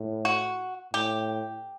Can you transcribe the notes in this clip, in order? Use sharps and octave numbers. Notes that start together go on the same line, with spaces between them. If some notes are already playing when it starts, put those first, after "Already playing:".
Already playing: A2
F#4
A2 G4